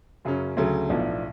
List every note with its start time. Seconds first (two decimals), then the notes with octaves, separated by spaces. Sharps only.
0.25 F#2 C#3 F#3 C#4
0.57 D2 C#3 F#3 A3
0.90 B1 A2 F3 B3 D4